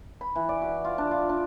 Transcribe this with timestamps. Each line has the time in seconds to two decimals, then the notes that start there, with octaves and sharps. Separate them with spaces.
0.21 B5
0.36 E3
0.49 D5
0.62 F#4
0.85 F4
0.98 D4
1.11 F4
1.29 D4